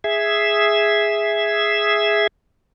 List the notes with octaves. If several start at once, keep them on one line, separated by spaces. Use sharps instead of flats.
G#4 E5